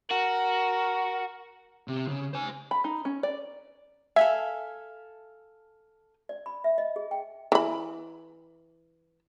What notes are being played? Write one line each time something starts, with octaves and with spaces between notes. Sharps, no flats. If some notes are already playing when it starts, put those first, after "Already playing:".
F#4 A#4
C3
C#3
C5 G#5
B5
D#4
C#4
D5
A4 E5 F5 G#5
D5
B5
E5
D#5
G#4
G5
E3 B5